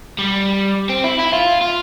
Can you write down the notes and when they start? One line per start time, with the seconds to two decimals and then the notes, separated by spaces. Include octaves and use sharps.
0.19 G3
0.90 C4
1.04 E4
1.19 E4
1.33 F4
1.62 F4